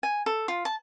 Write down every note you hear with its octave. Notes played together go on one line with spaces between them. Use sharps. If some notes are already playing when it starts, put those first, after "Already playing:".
G#5
A4
F4
A5